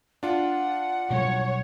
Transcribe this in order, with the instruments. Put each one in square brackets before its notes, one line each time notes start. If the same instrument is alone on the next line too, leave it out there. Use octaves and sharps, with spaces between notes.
[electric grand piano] D4 F4 [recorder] F#5
[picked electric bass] B2 F#3 G3 [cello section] C#5